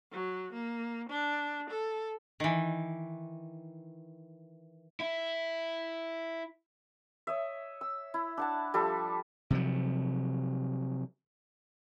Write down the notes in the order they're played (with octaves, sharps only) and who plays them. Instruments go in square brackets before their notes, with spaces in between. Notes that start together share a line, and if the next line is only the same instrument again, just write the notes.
[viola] F#3
A#3
D4
A4
[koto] D#3 E3
[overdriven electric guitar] E4 E5
[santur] C#5 D#5 E5
E6
E4
D4 F#5 A5
F3 G3 A4
[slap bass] C3 F3 F#3